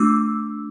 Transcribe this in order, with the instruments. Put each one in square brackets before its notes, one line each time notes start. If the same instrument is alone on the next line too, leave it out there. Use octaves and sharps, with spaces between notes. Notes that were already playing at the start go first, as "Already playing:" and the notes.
Already playing: [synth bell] A3 D4 F4 D6 E6